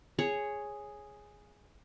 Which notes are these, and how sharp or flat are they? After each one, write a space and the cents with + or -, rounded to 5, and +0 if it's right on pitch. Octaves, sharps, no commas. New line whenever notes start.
G#4 +0 C#5 +0